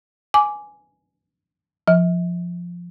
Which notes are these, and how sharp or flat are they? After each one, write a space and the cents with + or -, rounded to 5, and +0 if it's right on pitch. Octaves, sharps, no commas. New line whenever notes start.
G#5 +5 D6 -10
F3 +0 E5 -45